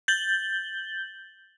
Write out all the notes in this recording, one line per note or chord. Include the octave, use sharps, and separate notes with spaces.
G6 A6 F#7 G7